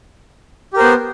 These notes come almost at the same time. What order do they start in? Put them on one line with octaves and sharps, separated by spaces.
G4 A#4 C5 B3